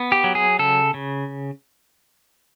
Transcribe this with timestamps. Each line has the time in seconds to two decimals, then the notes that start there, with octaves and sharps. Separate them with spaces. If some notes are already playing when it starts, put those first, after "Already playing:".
Already playing: B3
0.12 G4
0.24 F#3
0.35 G#4
0.59 C#3 A4
0.94 C#3